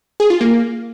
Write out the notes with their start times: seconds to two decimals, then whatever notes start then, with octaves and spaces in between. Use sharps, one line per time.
0.20 G#4
0.30 F4
0.41 A#3